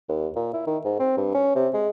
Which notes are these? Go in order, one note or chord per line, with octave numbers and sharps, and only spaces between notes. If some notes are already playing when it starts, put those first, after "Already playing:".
D#2
A#2
E4
D#3
G#2
C4
G2
C#4
C3
G#3